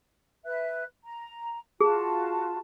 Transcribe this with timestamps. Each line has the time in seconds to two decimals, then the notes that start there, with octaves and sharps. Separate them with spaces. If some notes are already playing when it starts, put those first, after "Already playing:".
0.45 B4 E5 F#6
1.04 A#5
1.81 F4 F#4 G#4 A5